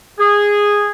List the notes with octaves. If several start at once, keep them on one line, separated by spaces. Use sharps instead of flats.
G#4